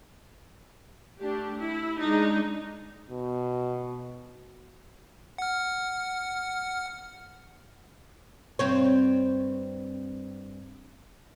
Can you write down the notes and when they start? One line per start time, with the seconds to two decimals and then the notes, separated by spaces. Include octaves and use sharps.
1.20 A3 D4 G4
1.59 E4
1.99 G#3 D4 D#4
3.10 B2
5.38 F#5 F6
8.59 G2 C4 C#5